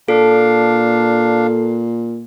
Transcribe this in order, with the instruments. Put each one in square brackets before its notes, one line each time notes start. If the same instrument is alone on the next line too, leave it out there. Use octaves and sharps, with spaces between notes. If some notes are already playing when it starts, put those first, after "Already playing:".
[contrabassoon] A#2 [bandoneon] D4 F5 [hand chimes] A4